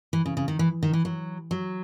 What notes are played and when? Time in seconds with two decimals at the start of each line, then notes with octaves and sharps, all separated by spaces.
0.13 E3
0.26 C#3
0.37 C#3
0.48 D#3
0.59 E3
0.83 D#3
0.93 E3
1.05 F#3
1.51 F#3